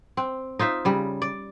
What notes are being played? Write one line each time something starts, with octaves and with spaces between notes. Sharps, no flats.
C4
D#4 F4 C5 E5
C#3 G3
D5